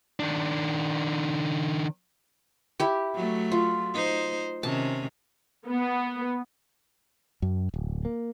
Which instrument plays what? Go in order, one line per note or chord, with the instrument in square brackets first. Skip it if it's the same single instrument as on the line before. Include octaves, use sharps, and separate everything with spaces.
[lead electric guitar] D#3 D4
[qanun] E4 G4
[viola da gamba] F#3 A3
[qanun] F4
[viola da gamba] D#4 C5
[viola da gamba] C3 D#3 C#4 [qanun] A5
[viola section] B3
[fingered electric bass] F#2
D1
A#3